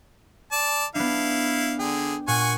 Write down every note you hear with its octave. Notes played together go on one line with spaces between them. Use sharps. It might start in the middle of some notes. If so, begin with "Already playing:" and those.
D5 A5
B3 D4 E4 F5
D3 G#4 G5
A#2 F#5 G#5 C#6